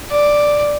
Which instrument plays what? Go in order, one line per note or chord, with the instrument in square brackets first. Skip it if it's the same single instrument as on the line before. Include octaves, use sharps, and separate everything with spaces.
[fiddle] D5